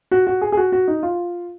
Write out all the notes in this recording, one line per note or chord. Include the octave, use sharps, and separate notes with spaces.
F#4
F#4
G#4
G#4
F#4
F#4
D#4
F4